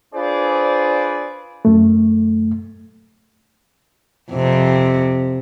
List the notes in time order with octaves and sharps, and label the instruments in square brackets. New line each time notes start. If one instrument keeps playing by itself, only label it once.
[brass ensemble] D4 F4 G#4 B4 C5 D5
[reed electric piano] F#2 A3
[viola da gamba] F2 C3